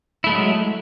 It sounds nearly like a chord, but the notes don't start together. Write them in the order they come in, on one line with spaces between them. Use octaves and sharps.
E4 A3 G#3 F#3